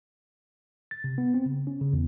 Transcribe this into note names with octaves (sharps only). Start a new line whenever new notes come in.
A6
C3
B3
C4
C#3
C#4
C#3
E2